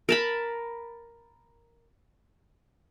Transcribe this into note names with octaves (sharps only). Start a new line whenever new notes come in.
A#4 A5 B5